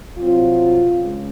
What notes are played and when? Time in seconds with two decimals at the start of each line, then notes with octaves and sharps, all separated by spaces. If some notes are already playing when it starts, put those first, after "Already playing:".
0.18 C2 C3 F#3 C4 F4
1.01 C#2 C#3